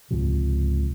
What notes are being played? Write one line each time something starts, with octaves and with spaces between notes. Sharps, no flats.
C#2 G#2 C3 F3